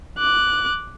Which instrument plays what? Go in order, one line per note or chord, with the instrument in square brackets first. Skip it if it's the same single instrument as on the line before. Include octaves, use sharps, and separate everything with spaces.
[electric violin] D6 F#6